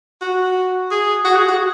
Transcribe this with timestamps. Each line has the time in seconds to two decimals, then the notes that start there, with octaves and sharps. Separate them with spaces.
0.21 F#4
0.91 G#4
1.25 F#4
1.36 G#4
1.48 F#4